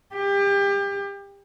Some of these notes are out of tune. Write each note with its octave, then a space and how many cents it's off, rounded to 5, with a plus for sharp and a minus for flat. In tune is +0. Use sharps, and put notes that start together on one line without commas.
G4 +30